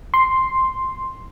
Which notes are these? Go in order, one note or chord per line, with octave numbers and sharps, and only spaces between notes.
C6